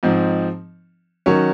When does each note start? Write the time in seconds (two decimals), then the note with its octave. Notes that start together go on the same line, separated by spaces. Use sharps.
0.03 G#2 F3 C4 D#4
1.26 D#3 F#3 C#4